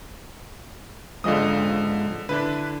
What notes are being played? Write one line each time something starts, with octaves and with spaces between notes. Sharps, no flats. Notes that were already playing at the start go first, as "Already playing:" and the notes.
G#2 D3 F3 G#4 D#5 D#6
D3 D4 E4 B4